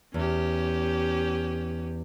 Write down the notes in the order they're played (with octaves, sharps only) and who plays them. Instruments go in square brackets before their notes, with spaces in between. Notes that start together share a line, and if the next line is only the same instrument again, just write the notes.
[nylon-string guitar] E2 [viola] C#4 G4